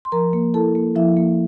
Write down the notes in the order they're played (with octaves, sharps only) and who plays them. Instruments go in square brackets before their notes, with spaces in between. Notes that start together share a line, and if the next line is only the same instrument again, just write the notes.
[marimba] C6
F3 A#4 A#5
A#3
E4 A4 A5
A#3
F3 E4 E5
A#3